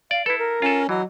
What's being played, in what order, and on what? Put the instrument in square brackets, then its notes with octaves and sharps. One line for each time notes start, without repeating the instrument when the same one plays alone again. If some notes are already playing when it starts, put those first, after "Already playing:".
[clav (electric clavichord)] D5 [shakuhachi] F5
[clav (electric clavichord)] E4 A4 [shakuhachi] B4
[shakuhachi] A#4
[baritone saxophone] C#4 [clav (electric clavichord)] F4 A4
[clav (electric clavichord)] E3 [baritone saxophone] F#3 [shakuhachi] D#5